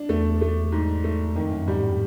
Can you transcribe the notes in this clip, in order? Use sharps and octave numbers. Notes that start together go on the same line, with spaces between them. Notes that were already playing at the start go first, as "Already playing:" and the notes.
Already playing: D4
E2 A3
A3
G#2
A3
F2 D#3
F#2
G#2 G3
A2